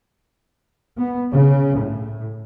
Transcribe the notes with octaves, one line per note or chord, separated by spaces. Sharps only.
B3
C#3
A2